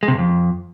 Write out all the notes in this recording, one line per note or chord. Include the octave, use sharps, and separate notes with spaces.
G#3
C3
G2
F2